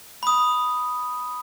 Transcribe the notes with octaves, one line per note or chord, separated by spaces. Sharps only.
B5 D#6